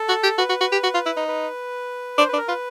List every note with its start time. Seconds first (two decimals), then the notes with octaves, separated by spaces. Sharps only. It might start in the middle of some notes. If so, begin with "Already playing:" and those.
Already playing: A4
0.09 F#4
0.23 G4
0.38 F#4 B4
0.49 F#4
0.61 F#4
0.72 G4
0.83 F#4
0.94 F4
1.06 E4
1.17 D#4
1.28 B4
2.18 D4 C5
2.28 D4 B4
2.38 A#4
2.48 F4 B4